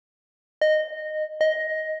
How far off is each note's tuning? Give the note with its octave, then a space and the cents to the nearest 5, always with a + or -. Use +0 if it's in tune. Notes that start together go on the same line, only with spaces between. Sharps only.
D#5 -15
D#5 +10